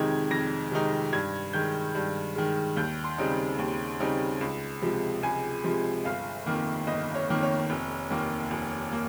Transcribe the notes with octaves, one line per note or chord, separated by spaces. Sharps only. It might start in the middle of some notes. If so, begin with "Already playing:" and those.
Already playing: F2 C3 D#3 G#3 D#4 G#6
F2 A#6
C3 D#3 G#3 D#4
G2 G#6
D#3 G#3 G6
G2
D#3 G#3
D#2 G6
C6
C#3 G3 C4 D#4
D#2
C#3 G3 C4 D#4
C#2
C3 F3 G#3
C#2 G#5
C3 F3 G#3
G1 F5
F2 D#3 A#3
G1 D#5
C#5
F2 D#3 A#3
C#5
F1
D#2 D#3 A#3
F1
A#3